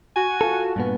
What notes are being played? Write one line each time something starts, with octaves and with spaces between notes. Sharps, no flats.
F#4 G#5
F4 A4
G2 A#2 B3